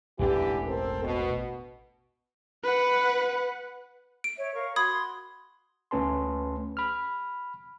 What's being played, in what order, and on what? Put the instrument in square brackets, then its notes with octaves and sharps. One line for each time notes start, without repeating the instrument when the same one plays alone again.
[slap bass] E1 A1 D4 [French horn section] D3 E3 G4
[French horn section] C4 A4 A#4
B2
[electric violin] B4 F#5
[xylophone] D7
[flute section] C#5 E5
A#4 F5 C#6
[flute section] F#4 C6 [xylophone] B5 D#6 G#6
[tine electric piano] D2 A3 C#4 B4 A5 C6
B5 F6